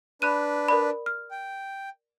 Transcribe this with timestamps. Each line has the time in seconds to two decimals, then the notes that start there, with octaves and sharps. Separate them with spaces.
0.22 D4 B4 B5 F#6 D#7
0.68 A#4 D5 B5
1.06 F6
1.31 G5